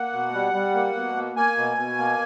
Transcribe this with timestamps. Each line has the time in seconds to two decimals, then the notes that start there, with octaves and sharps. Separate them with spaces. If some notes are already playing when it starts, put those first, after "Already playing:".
Already playing: A#3 F#5
0.13 B2
0.34 G3
0.53 G3
0.74 A#3
0.95 B2
1.16 A#3
1.36 A#3 G#5
1.57 B2
1.78 B2
1.98 A#3